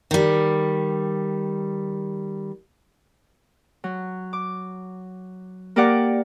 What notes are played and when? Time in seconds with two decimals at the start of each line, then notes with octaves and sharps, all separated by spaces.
0.11 D#3 G3
3.84 F#3
4.33 D6
5.76 A#3 G4 A#4 D5 F#5 D6